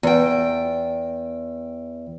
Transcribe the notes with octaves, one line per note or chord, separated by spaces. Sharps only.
E2 G5